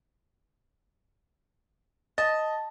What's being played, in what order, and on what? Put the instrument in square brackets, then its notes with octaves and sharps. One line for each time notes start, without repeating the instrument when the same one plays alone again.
[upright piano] D#5 [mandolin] A5